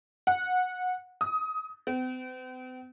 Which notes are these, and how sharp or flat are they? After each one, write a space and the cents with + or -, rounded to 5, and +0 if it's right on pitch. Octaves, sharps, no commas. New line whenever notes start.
F#5 -20
D#6 +20
C4 -45